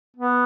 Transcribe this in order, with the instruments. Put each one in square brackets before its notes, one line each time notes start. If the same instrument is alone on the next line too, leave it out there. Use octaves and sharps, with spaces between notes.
[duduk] B3